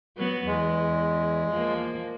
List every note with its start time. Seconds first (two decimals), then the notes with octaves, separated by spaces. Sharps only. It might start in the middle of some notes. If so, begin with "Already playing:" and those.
0.17 F#3 B3
0.47 E2 G#3
1.51 F3 A#3